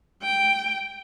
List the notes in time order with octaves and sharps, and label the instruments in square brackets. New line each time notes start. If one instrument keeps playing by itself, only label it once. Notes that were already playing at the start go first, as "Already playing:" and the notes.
[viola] G5